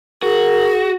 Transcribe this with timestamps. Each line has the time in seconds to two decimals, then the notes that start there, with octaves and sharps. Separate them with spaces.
0.23 F#4 G#4 A#4